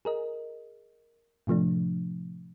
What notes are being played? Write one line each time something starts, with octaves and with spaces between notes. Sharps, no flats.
G#4 A#4 D#5
A2 C3 F3 A3 D4